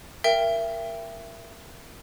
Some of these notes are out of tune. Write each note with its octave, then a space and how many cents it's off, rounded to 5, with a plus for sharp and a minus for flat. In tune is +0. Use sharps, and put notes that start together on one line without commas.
A#4 +0 E5 +25 G5 +10